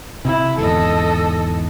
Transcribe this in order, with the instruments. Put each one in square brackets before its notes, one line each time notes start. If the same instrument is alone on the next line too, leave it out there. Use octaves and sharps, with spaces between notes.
[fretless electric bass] C3 [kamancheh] E4
[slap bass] E2 G#2 D3 [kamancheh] A4 D#5